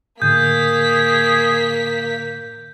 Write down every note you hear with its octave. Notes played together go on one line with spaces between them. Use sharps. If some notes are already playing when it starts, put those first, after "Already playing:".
A2 D3 A#3 G#4 G6 B6